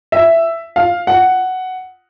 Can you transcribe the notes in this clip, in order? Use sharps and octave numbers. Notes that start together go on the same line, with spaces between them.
E5
F5
F#5